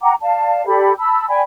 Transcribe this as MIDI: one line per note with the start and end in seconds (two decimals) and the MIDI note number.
0.01 0.13 78
0.01 0.13 79
0.01 0.13 82
0.01 0.13 86
0.21 0.65 74
0.21 0.65 77
0.21 0.65 81
0.66 0.92 67
0.66 0.92 69
0.66 0.92 74
0.66 0.92 83
0.98 1.25 81
0.98 1.25 83
0.98 1.25 88
1.28 1.41 74
1.28 1.41 79
1.28 1.41 80
1.28 1.41 83